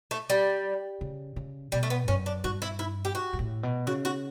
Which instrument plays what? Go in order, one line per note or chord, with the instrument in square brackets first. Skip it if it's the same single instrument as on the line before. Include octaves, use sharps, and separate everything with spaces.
[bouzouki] A3
G3
[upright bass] C#3
C#3
[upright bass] B2 [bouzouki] G3
[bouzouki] A3
B3
[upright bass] G2
[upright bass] F#2 [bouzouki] C#4
[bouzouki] D4
[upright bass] G2 [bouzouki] F#4
[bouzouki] E4
E4
G4
F#4
[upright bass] G2
A2
B2
[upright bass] C#3 [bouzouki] F#4
[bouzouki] F#4